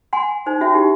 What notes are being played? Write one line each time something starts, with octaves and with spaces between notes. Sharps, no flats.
F#5 G#5 C6
D#4 C5
C#4 F#4 E5
D#4 E4 G4